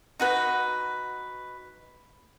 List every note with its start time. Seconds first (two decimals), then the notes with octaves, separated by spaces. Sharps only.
0.20 D#4 F#4 B4